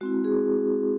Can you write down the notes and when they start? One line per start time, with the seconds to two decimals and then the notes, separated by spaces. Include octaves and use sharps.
0.01 G#3 C4 E4 F#4
0.24 G#4